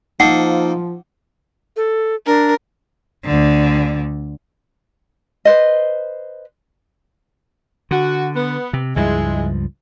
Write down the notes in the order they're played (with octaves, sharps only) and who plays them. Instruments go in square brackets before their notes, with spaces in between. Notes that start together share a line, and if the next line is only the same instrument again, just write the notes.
[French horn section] F3 [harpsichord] A#3 D#4 A4 [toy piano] F#5
[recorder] A4
[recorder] D4 [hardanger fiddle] A#4
[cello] D2 D3
[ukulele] B4 C5 D#5
[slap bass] D3 [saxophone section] F#4
[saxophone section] B3
[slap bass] C3
[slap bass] C#2 G2 F3 [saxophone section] G#3 E4